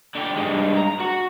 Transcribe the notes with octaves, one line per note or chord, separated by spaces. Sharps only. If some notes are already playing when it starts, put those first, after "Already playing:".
D3 G4
G2 G#3
A#5
F#4